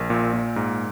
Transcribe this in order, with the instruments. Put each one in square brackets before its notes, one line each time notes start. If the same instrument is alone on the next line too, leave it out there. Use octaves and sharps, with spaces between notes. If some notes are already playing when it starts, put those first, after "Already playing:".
Already playing: [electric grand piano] A#1 A#4
A#2
A#2
G#2